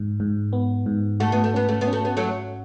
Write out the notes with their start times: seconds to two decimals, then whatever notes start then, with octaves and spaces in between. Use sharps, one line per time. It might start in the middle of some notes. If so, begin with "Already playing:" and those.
Already playing: G#2
0.20 G#2
0.53 B3
0.86 G#2
1.20 A3 F#4
1.32 B3
1.44 A3
1.54 B3 C#4
1.69 A3
1.81 B3
1.87 C#4
1.93 A3
2.05 B3
2.17 F#3 A3 F#4